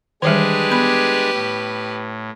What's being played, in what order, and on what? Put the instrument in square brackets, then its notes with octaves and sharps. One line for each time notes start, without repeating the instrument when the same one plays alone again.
[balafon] D#3 E3 G3 [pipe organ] G#3 D4 G#4 [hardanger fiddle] G4 B4
[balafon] B3 B5
[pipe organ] A2